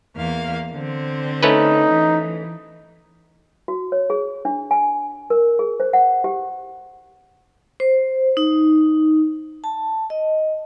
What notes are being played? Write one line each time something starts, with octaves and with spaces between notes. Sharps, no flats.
E2 A#3 F5
D3 C4
A3 C#4 D#4 B4
E3
F#4
C#5
G#4
D4
G#5
A#4
G#4
C5
F#5
G4
C5
D#4
A5
D#5